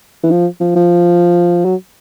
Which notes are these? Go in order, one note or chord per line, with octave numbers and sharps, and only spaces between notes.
E3
F3
F3
F3
F#3